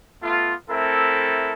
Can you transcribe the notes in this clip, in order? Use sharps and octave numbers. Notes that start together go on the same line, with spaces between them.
A3 B3 F4
A3 C4 E4 A4 A#4